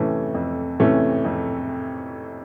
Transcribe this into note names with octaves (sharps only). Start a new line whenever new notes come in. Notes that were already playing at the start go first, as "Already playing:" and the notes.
Already playing: F2 C3 E3 A3 C#4
F2
C3 E3 A3 C#4
F2